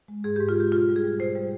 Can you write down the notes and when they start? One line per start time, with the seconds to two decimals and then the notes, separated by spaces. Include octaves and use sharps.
0.08 G#3
0.24 G#2 G#4
0.36 G4
0.40 G#2
0.49 F4
0.56 G#3 G4
0.72 B2 F4
0.88 G3
0.96 G#4
1.04 G3
1.20 B2 C5
1.35 G3